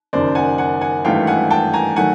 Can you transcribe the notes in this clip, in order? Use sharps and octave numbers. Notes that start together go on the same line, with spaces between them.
F#1 F#2 D#3 C5 D5
F#5 G#5
F#5 G#5
F#5 G#5
G#1 G2 E3 A3 F5 G5
F#5 G#5
G5 A5
G#5 A#5
D#3 F#3 A3 F#5 G#5